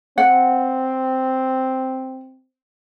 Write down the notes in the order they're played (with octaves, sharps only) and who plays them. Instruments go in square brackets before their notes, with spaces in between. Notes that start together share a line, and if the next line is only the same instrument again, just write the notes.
[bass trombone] C4 [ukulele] F#5